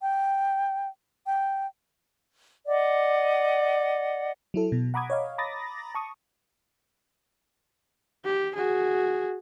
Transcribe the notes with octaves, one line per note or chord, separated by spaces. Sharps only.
G5
G5
D5 D#5 F#5
F#3 E4 A4
B2
F#5 A#5 B5 D6 D#6 G#6
C#5 D#5 F5
A#5 B5 D6 D#6 A6 A#6
A5 C#6 D#6
G4
F#4 G#4